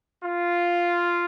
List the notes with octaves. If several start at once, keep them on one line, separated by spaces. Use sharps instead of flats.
F4